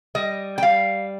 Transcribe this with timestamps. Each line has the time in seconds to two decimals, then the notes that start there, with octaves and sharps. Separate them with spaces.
0.15 G3 D#5
0.58 G5
0.62 G3 F5